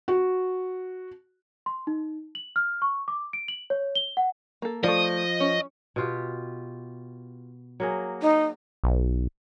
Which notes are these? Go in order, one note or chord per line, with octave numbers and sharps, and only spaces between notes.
F#4
C6
D#4
F#7
F6
C#6
D6
D7
F#7
C#5
G7
F#5
A#3 A4
F3 A3 D5 D#5
C#4
B2 F4 G4
F#3 A#3 G#4
D#4
B1